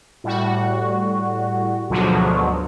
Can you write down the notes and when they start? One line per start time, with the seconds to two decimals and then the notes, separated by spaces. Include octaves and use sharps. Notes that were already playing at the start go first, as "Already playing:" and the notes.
0.24 A2 G3 F#4
1.90 D2 G#2 B2 D3 F3 F#3